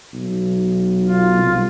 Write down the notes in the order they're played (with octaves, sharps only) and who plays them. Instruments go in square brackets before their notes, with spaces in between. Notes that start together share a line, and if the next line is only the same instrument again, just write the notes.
[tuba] B1
[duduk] F4
[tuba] C2